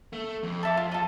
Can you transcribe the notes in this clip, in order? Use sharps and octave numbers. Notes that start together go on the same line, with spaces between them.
A3
F2
A4 E5 D6
F4
A4 D#5